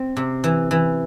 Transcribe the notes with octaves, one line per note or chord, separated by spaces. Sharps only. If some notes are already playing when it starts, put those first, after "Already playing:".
Already playing: C4
C3
E3
E3